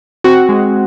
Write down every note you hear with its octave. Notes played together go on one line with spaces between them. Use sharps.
C4 F#4
G#3